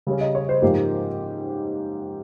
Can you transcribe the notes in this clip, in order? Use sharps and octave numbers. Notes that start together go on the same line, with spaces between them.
C#3 G3 C#4
D#5
C#5
C5
G#2 F3 A#3 G4